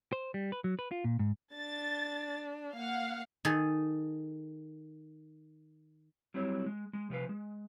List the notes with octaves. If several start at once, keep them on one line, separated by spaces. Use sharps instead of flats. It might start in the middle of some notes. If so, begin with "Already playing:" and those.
C5
G3
B4
F#3
B4
F4
A#2
G#2
D4 A6
A#3 F5 F#5
D#3 G#4 A4
F#3 G3 C4 E4 G4 C#5
G#3
G#3
C3 F3 B4 F5
G#3